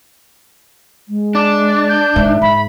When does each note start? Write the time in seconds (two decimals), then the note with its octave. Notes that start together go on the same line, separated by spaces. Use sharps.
1.09 G#3
1.35 D4 D6
1.89 G6
2.16 G#2 D#3 E5
2.42 G#2 B5